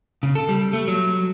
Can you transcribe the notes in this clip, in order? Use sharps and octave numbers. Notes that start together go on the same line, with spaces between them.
C#3
A4
G3
A3
F#3